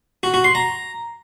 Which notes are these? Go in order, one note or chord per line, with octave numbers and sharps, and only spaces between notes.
F#4
F#4
C6
A#5